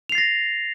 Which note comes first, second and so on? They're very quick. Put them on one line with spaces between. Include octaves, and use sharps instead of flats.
F7 C7 A6 A#6